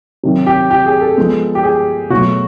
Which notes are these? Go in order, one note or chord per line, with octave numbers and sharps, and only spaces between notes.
C3 D#3 F#3
G4
G4
G#4
A4
F3 G#3 B3
G4
G#4
B2 F#3 A3 F#4